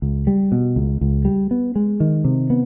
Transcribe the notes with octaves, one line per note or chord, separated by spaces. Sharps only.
C#2
G3
B2
C#2
C#2
G3
B3
G#3
D#3
C3
B3